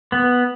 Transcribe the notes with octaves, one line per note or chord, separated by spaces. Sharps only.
B3